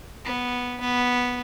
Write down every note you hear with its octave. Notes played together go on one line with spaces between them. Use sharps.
B3
B3